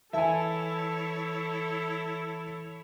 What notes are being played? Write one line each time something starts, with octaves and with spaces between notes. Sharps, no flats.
E3 E4 A4 C#5 E5 G#5 A5